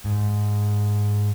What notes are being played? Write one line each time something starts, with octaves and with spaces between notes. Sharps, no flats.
G#2